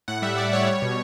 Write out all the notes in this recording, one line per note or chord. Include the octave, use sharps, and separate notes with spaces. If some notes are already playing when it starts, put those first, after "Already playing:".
A2 F#5
G3 E5
G3 D5
G3 C#5
G3
B2